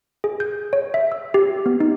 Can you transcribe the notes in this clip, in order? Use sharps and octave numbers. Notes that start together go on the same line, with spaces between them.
G#4
G6
C#5
E5
E6
G4
B3
D#4